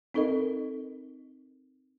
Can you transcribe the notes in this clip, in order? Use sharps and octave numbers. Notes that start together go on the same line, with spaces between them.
C4 D#4 A4 A#4 D#5